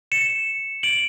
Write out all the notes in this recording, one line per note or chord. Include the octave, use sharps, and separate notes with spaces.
C#7 E7
D7 F#7